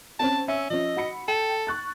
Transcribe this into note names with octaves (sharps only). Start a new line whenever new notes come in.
C4 C#4 A5
C#4 E5 E6
F3 C#4 D#5
F#4 B5 C#7
A4 G5
C#6 F#6 A6